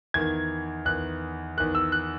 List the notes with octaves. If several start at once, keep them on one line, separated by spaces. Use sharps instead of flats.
E2 D#3 G#6
E2 D#3 F#6
E2 D#3 F#6
E6
F#6